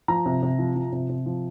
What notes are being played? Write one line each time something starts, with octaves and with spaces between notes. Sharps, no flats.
F3 A#5
C3
C3
F3
F3
C3
C3
F3